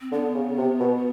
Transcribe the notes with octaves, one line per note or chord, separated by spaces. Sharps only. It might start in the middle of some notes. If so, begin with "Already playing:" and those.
C4
D3 B3
C#3
C3
B2